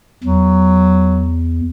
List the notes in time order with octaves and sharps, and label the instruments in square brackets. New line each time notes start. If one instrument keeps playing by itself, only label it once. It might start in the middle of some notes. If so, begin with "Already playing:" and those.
[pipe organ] E2 [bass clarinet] F#3